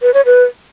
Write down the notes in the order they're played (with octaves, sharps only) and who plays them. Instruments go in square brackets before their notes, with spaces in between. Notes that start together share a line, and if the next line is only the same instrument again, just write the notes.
[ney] B4
C#5
B4